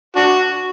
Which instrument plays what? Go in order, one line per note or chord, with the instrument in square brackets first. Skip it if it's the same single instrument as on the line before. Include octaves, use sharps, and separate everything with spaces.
[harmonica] D4 F#4